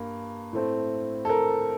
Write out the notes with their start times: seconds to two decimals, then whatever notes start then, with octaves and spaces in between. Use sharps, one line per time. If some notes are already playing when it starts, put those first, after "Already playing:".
Already playing: G2 A#3
0.53 A2 A3 C4
1.25 A4
1.29 A#4